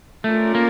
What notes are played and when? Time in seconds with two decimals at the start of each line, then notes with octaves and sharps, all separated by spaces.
0.24 A3 C#4 F4 A#4 D5
0.55 A#3